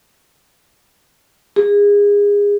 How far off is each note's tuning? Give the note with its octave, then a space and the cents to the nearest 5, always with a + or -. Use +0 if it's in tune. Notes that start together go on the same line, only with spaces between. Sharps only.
G#4 -25